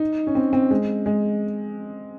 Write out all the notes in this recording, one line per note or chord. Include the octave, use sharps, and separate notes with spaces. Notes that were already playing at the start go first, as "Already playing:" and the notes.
Already playing: D#4
C#4
C4
C4
G#3
G#3